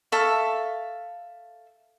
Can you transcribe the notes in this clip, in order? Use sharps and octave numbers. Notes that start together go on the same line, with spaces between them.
A4 E5 F5 C#6